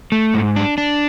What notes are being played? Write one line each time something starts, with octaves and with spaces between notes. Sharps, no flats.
A3
G#2
D4
D4